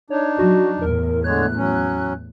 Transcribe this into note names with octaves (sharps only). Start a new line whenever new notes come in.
D4 D#4 C#5
F#3 F#4
E2 A2 A#4
D3 G#3 C#5 F#6
F#3 C#4